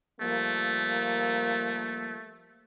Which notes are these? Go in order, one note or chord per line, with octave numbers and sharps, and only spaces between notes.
F3 G3 A3 A#3